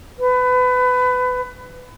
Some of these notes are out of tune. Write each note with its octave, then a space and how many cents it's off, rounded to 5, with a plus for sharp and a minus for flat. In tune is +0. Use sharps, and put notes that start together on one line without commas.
B4 +25